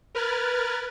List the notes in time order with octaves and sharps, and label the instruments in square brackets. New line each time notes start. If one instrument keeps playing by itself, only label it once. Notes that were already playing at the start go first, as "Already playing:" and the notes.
[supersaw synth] A#4 B4 F6 F#6 G#6 A6